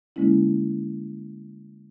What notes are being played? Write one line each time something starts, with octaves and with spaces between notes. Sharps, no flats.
D3 G3 G#3 A#3 C#4 E4